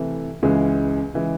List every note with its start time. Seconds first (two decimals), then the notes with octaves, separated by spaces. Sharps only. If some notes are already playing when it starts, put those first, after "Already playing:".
Already playing: C3 E3 A3
0.43 C#2 C#3 E3 G#3
1.14 C#3 E3 G#3